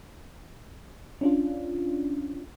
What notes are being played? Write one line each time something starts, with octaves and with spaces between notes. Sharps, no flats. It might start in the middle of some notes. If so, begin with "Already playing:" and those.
C#4 D4 F4